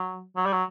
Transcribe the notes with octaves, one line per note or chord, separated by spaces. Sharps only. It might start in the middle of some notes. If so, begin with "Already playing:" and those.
Already playing: F#3
F#3
G3
F#3